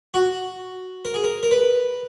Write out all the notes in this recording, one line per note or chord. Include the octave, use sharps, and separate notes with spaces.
F#4
A#4
G#4
A#4
A#4
B4